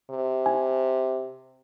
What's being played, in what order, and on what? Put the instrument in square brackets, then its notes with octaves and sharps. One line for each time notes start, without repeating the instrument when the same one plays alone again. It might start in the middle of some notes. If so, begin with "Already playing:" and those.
[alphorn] C3
[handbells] G#5